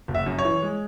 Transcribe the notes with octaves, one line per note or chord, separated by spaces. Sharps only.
F#1
E5
F#2
C#5
E3
G#3